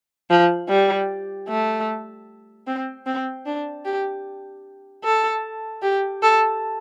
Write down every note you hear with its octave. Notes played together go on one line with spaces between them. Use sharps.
F3
G3
A3
C4
C4
D4
G4
A4
G4
A4